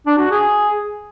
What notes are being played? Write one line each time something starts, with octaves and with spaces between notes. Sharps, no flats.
D4
F#4
G#4